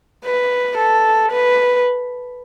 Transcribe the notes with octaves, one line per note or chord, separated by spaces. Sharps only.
B4
A4
B4